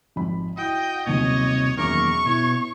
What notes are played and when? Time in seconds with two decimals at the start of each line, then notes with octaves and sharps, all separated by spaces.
0.16 G#1 F2 B5
0.58 E4 F#4 D#5 G5
1.06 D#1 B1 C3 D#3 C#5 D#5
1.78 E1 F#2 D#3 A#3 A#4 C#6 D6
2.26 B2 B3 E4 C#5